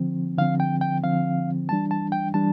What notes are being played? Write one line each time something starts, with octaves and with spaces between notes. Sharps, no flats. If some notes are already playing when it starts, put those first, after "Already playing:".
Already playing: D3 F3 C4
D3 F3 C4 F5
G5
G5
D3 F3 C4 F5
E3 G3 D4 A5
A5
G5
E3 G3 D4 A5